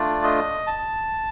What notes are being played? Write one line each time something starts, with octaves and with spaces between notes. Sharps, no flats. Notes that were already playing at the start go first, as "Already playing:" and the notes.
Already playing: A3 D4 F4 D5
D#5
A5